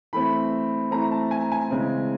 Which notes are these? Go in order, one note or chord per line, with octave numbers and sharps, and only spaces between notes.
E3 A3 C4 B5
E3 A3 C4 A#5
A5
G#5
G#5
C#3 E3 G#3 C4